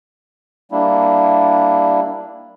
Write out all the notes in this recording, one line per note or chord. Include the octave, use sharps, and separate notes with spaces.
G3 A#3 D4 E4